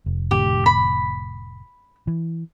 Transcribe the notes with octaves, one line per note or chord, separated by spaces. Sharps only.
F1
F1 A2 D3 G4
B5
E3